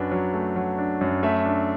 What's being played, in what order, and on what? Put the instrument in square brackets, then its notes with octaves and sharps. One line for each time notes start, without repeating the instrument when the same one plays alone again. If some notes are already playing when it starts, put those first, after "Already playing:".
Already playing: [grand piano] F#2 F#3 D4 B4
F#3
A3
F#3
D4
F#2
A3 E5
D4